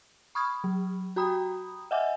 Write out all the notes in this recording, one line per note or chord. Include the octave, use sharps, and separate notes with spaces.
B5 C#6 D#6 F6 G#6
F#3
F#4 G4 G5 A#5 B5 D#6
D#5 E5 F#5 G#5 D6